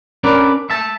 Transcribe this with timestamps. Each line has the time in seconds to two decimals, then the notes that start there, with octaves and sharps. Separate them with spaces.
0.24 C#4 D4 A#4 B4 D5
0.70 E5 A5